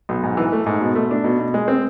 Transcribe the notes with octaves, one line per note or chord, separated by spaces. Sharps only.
B1
G#2
E3
A3
G#2
B2
A3
D4
B2
B2
G#3
C4